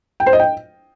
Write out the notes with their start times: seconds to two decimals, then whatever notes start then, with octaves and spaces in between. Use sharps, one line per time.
0.20 G5
0.26 C5
0.33 D#5
0.39 G5